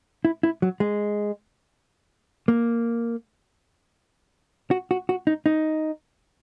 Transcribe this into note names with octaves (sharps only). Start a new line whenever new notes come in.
E4
E4
F#3
G#3
A#3
F#4
F#4
F#4
D#4
D#4